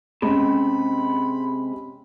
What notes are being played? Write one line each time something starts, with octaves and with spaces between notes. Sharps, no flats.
C3 G#3 C#4 B5